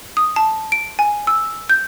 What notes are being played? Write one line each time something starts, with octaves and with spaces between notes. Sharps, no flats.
D#6
A5
D7
G#5
E6
G6